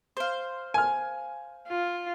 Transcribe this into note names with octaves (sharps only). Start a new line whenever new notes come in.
C5 F5
G#5 F6
F4